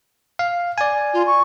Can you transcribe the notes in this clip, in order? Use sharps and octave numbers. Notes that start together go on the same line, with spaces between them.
F5
D5 G#5
F4
C#6